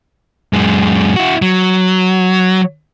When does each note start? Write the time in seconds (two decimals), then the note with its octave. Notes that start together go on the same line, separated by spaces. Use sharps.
0.53 F#2 G#3
1.16 E4 F#4
1.42 F#3